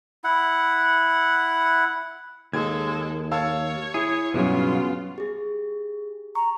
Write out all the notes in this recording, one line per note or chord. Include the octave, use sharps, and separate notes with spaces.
E4 F#5
D#2 G#3 A4 G#6
C#5 F5 A5 E6
E4 G#4
B1 G2 C#3 F#3 B3 C#4 F4
G4 G#4
A#5 C#6